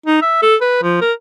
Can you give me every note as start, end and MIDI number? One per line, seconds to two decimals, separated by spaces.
0.06 0.20 63
0.22 0.39 76
0.43 0.56 69
0.61 0.82 71
0.83 0.99 53
1.02 1.13 70